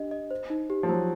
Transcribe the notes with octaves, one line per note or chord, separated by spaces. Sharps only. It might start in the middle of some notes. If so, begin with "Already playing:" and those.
Already playing: D4 G4 D#5
D#5
C5
D#4
G4
F3
F#3 C5